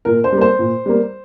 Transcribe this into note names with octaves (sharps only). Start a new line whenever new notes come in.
A#2 A#4
C5
G3
A#3 C5
A#2
G3 A#3